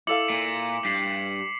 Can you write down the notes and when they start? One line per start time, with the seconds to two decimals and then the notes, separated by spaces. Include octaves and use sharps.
0.07 E4 A4 F5 D6 C#7 F#7
0.30 A#2
0.85 G2 B6 C7